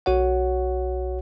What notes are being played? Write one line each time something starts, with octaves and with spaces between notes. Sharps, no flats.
B1 F#4 C#5 F#5